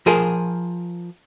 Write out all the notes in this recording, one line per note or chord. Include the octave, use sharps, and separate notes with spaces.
F3 G#4 A#4